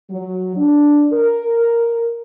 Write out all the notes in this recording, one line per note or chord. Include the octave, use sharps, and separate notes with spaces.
F#3
D4
A#4